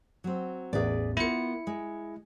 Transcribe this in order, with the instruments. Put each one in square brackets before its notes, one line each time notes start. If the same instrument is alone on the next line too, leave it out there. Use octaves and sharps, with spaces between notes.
[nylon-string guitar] F#3 C4
[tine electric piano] A1 E2 [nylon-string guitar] G#4 B4 D5
[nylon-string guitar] B3 F4 A#4 [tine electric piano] E4 C#7
[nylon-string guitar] G#3